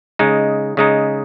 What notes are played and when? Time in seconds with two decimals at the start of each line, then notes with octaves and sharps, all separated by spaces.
0.19 C#3 G#3 D#4
0.77 C#3 G#3 D#4